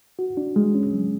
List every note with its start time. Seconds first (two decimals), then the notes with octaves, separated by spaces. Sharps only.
0.19 F#4
0.37 D4
0.56 G#3
0.75 C#4
0.93 F#3